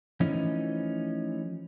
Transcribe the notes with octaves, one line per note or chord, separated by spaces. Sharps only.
E3 F3 A3 C#4 D#4